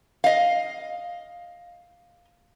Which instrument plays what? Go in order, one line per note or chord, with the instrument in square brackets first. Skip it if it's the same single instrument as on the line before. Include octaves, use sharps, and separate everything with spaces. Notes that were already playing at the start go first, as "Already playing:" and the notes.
[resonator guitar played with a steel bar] D#5 F5